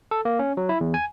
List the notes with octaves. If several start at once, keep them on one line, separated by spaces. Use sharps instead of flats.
A4
A#3
C#4
F#3
E4
E2
G#5